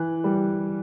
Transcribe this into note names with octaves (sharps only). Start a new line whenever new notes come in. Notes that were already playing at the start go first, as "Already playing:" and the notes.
Already playing: E3 F#6
G3